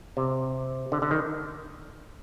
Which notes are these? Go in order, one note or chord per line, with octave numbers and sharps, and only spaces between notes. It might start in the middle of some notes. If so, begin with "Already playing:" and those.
C3
D3
D3
D#3